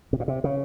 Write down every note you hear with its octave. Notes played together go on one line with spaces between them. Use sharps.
C3
A#2
C3
C#3